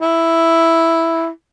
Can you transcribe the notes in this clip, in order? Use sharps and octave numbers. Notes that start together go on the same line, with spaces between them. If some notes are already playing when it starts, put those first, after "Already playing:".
E4